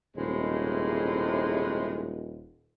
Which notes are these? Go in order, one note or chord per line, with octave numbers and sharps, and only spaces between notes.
D#1 A2 C3 G#3